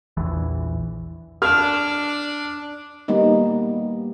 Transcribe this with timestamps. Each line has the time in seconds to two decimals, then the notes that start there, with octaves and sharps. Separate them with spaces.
0.17 A#1 E2 E3
1.42 D4 F6
3.08 G3 A#3 B3 D#4